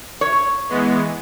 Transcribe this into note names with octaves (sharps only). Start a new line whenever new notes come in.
C#5
E3 G#3 B3